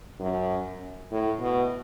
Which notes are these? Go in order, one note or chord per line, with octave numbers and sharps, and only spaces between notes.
F#2
A2
B2